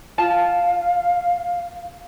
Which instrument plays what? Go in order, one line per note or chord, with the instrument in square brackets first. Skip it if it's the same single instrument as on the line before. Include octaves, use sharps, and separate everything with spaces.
[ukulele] F4 A5 [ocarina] F5